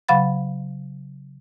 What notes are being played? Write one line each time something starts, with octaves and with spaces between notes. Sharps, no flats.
C#3 F#3 F5 F#5 B5 A6